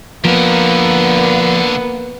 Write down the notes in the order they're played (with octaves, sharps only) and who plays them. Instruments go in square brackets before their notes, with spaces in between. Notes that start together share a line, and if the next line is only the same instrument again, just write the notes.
[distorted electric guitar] D3 A#4 [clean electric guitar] F3 [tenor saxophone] A#3 [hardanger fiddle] B3